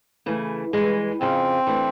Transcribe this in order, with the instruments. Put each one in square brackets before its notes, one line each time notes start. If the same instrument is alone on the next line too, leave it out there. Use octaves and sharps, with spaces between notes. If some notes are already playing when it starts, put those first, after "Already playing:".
[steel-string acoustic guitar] C#3 E3 A3
G2 E3 G#3
[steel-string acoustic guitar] F2 C#3 F3 [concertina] C4
[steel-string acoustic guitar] E3 A3 D4